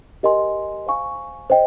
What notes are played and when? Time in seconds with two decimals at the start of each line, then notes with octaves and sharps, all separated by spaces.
0.23 G4 A#4 D#5 G#5 C6
0.86 C5 F5 G#5 C#6
1.50 C5 D#5 G5